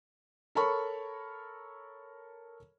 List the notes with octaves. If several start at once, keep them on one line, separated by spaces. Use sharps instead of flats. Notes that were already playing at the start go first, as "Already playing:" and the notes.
A4 A#4 C#5 A5 B5 C#6